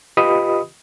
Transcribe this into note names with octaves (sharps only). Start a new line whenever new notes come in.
F4 G4 B4 D#5 B5 D#6